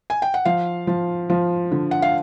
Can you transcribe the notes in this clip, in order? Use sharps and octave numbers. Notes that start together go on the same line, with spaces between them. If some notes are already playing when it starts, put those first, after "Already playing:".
G#5
G5
F#5
F3 F5
F3
F3
D3
F#5
F5